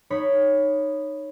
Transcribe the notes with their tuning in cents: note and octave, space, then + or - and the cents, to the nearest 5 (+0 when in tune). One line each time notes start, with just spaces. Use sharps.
D#4 -15 C#5 +0 B5 +0